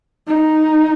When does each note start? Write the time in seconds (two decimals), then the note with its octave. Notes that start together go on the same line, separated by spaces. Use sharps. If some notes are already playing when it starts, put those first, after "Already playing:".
0.28 D#4